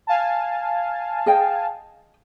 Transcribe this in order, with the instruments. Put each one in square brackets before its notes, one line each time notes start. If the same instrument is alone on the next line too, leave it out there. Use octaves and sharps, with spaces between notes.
[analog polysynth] F5 G#5 A5
[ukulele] G#4 D#5 G5